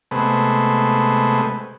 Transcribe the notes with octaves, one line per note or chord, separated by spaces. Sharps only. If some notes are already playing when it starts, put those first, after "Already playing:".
C3 G#3 A3 B3